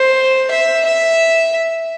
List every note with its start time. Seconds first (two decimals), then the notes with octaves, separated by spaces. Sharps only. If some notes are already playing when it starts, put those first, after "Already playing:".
Already playing: C5
0.51 E5
0.85 E5